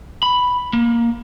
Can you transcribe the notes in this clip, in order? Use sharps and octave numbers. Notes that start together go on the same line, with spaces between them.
B5
A#3